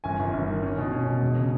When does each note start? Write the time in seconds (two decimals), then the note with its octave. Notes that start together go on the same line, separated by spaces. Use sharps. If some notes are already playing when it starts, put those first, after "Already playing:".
0.04 G1 G#5
0.19 G1
0.33 G1
0.49 D#3
0.63 C#4
0.78 B2
0.92 C#4
1.07 B2
1.22 E1
1.36 C#3